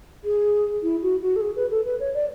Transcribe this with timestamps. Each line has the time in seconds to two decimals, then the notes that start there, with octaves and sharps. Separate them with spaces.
0.25 G#4
0.83 E4
1.02 F#4
1.22 F#4
1.36 A4
1.41 G#4
1.56 B4
1.71 A4
1.85 B4
2.00 C#5
2.14 D5